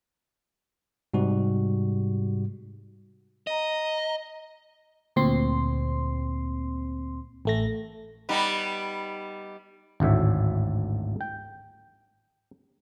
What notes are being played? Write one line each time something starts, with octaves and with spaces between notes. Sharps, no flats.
G#2 C3 G3 F#4
D#5 A#5
D2 A#2 C4 C6
A1 A3 A#6
G3 B3 D#4
G#1 D2 A2 E5
G5